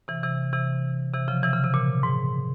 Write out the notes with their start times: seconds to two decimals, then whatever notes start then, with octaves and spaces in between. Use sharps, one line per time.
0.08 C3 E3
0.23 C3 E3
0.53 C3 E3
1.14 C3 E3
1.28 C#3 F3
1.43 C3 E3
1.54 C#3
1.64 C3
1.74 A#2
2.03 G#2